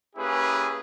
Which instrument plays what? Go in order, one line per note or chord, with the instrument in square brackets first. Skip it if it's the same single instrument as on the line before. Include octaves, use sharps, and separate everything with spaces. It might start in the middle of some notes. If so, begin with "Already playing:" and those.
[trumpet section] A#3 C#4 E4 G4 G#4 B4